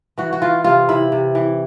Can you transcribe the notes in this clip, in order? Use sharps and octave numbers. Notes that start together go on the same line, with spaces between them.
E3 F#4
F#4
E3 F4
C3 F4
C3 E4
C3
E3